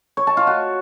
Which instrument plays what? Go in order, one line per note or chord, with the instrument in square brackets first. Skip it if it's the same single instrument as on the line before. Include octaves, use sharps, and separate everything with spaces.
[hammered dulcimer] C#5
A5
F4
F#4